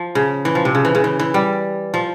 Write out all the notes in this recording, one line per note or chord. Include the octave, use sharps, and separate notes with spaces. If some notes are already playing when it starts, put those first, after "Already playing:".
Already playing: F3
C#3
E3
F3
C3
C#3
E3
C#3
E3
E3
G3
F3